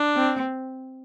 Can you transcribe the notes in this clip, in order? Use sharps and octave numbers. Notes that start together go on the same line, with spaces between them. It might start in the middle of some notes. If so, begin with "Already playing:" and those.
Already playing: D4
C4